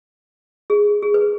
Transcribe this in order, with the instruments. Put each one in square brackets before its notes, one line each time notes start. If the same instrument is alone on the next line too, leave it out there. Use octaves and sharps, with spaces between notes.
[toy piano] G#4
G#4
B4